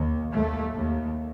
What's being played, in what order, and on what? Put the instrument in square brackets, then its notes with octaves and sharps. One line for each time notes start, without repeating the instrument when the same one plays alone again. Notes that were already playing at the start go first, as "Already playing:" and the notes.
Already playing: [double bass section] D#2
D#2 A3
D#2